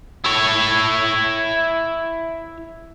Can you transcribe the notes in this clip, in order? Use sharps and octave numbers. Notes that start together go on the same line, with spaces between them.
E4 C#5